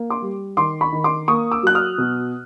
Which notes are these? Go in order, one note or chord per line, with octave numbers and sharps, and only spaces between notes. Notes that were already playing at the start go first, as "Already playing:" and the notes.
Already playing: A#3
C6 D6
G3
D#3 C6 D6
B5 C#6
D#3
C6 D6
A#3 C#6 D#6
D6 E6
F#3 F#6
D#6 F6
B2